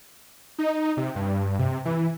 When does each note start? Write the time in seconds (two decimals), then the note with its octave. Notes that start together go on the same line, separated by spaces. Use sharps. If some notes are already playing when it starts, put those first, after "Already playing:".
0.59 D#4
0.97 C3
1.16 G2
1.59 C3
1.85 E3